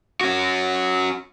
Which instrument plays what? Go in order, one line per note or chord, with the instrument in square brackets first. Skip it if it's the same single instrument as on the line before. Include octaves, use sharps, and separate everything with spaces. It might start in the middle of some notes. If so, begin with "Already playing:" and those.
[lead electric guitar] C#4 F#4